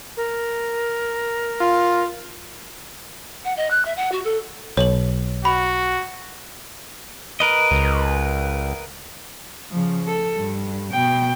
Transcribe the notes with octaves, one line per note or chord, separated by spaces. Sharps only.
A#4
F4
F#5
D#5
F#6
E5
F#5
F#4
A4
B1 C#5 F#7
F#4 B5
A#4 B4 D#5
C#2
C#3 F3
A4
G2
B2 G5